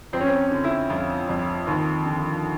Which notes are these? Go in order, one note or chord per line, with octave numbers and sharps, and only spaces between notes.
F2 C4
C#4
C4
D3
E4
F2 F4
F2
D#2
D3